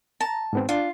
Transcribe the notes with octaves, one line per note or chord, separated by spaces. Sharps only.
A5 A#5
G#2 B3 C4
D4 F4